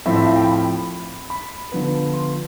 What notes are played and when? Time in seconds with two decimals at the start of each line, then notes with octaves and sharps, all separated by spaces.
0.06 A2 F3 C4 E5
0.16 E5
0.26 F5
0.36 G5
0.47 B5
1.30 B5
1.72 D3 F3 B3
2.14 C6